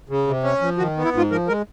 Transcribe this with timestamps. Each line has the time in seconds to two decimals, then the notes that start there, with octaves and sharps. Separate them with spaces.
0.09 C#3
0.27 C3
0.43 C#4
0.61 F3
0.78 D#3 F#4
0.97 B3
1.05 E4
1.13 G#2 F4
1.31 F3 A#4
1.48 G#3 A#4